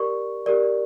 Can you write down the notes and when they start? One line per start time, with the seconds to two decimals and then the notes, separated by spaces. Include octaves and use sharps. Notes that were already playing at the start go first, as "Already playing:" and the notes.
Already playing: G4 A#4 D5 C#6
0.46 G4 A#4 D5